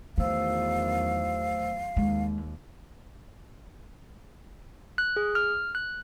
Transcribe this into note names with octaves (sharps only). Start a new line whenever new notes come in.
E2 D#3 E3 F#3 A3 C5 F5 E6
D#2 G#3
F#6
G#4
F6
F#6